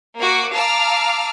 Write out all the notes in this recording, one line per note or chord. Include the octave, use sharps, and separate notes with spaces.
A#3 F#4 D6
F5 A5 A#5 D6 E6 F6